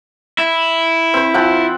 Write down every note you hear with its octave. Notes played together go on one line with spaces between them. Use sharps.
E4
C4 C5
F3 F#5 G5